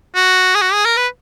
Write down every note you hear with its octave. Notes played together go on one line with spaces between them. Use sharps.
F#4
G#4
F#4
G#4
A#4
B4